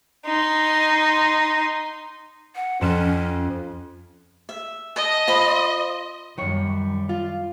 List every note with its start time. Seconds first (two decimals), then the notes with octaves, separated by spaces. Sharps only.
0.25 D#4 C6
2.55 F#5
2.81 F2 C#4 C#7 E7
4.49 E5
4.96 D#5 A5
5.27 F4 C5 B5
6.38 F#2 D#3 G3 C#5
7.09 F4